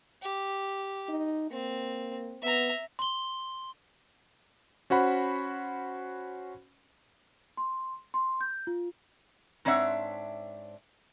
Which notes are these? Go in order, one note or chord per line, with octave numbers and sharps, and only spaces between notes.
G4
D#4
A#3 C4
B3 E5 A#5
C6 G7
C#4 F#4 C5 F#5 B5
C6
C6
G6
F4
G#2 C4 D4 C#5 E5 F#5